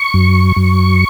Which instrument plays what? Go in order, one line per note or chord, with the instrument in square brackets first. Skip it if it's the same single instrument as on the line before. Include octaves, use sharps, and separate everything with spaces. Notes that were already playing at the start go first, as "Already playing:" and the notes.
Already playing: [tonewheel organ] C#6
F#2
F#2